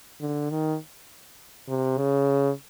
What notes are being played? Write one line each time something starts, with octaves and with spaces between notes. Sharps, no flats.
D3
D#3
C3
C#3